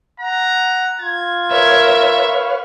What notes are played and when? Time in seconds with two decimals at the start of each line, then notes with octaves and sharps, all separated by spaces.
0.20 F#5 A#5
1.01 F4 G#6
1.51 A#4 B4 C#5 E5 F5